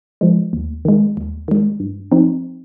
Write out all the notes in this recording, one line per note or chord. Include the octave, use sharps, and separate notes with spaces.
F3 G#3
D#2
D#3 G#3
D#2
D#3 G#3
G2
F3 C4 D#4